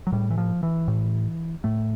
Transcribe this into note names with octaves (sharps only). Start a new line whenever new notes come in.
F#3
A2 G3
E3
F3
E3
A2
A2 A3